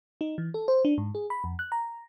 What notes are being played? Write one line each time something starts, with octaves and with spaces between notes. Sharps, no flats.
D#4
E3
A4
C5
D4
G#2
G#4
B5
F2
F#6
A#5